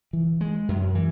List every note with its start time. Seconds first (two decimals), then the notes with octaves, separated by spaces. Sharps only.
0.13 E3
0.41 G#3
0.68 F#2
0.95 E3